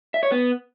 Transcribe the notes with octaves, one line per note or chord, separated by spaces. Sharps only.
E5
C#5
B3